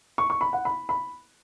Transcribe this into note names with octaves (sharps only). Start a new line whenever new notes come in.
C#6
C#6
B5
F#5
B5
B5